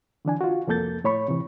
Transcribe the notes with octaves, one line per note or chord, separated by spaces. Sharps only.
D3 E3 D4 G#5
F4 F#4
C2 F2 A#3 A4 G6 A6
A2 C#5 B5 C#6
C3 E3